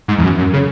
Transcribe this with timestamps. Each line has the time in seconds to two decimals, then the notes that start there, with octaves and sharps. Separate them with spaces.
0.08 G#2
0.18 E2
0.23 F#2
0.38 F#2
0.53 C#3